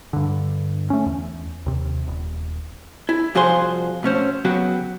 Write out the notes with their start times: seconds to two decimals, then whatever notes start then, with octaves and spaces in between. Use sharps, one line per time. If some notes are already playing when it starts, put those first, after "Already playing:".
0.13 G2 D3
0.90 A3 C#4
1.06 E2
1.66 D#2 C3
2.08 D#1
3.09 E4
3.35 C2 F3 F#4 G#4 C5 C6
4.03 B2 A3 C#4 C5
4.45 C#3 F#3 B3 F#4 G4